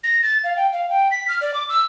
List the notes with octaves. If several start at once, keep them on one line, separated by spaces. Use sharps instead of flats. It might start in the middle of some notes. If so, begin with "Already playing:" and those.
A#6
A6
F5
G5
F5
G5
B6
F6
D5
D6
E6